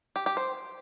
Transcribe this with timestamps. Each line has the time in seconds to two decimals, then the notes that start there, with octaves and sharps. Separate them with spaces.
0.16 G4
0.26 G4
0.37 C5